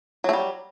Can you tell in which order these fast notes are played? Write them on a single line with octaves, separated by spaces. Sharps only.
F#3 A3 G3